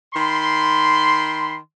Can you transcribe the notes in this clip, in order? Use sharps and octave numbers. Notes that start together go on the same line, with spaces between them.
D#3 B5 C6